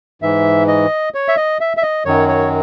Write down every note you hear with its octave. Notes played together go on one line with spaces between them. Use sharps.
G#2 E3 E5
D#5
C#5
E5
D#5
E5
E5
D#5
F#2 D#3 F#3 C#5
C#5